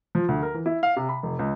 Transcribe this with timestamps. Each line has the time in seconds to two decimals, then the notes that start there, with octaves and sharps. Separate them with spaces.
0.15 F3
0.28 D2
0.43 A#4
0.54 E3
0.66 E4
0.83 F5
0.96 C3
1.09 B5
1.23 F1
1.39 C#2